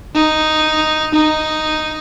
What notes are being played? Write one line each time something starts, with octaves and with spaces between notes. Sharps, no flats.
D#4
D#4